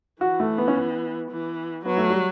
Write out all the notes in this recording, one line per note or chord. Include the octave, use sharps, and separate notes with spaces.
E3 F#4
A3
B3
C#4
B3
E3
F#3 B3
A3
G3